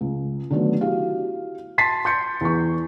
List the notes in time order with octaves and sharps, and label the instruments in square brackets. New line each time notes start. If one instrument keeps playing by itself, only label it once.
[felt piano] C#2
D3 D#3 F#3 A3 B3
E4 F#4 G4 F5
A5 C6 A6 B6 C7
C6 G6 C#7
E2 C#6